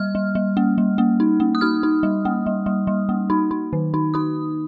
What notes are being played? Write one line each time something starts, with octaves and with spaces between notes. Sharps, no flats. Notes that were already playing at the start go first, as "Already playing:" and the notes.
Already playing: G3 F6
G3
G3
A#3
G3
A#3
D#4
A#3
D#6
D#4 F6
D#4
G3
A#3
G3
G3
G3
A#3
D#4
D#4
D#3
D#4
D#4 D#6